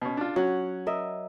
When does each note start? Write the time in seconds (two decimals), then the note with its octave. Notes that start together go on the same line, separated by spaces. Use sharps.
0.02 B2 C#4
0.17 D4 F4
0.36 F#3 C#4 F#5
0.86 A#4 D#5 E5